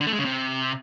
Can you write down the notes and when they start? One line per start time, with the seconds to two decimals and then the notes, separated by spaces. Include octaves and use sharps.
0.01 D3
0.07 A3
0.13 G#3
0.19 C#3
0.25 C3